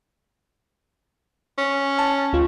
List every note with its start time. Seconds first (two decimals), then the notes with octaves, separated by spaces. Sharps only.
1.58 C#4
1.98 A5
2.33 D2 F4